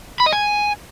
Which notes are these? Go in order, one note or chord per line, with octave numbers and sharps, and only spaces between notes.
B5
D#5
G#5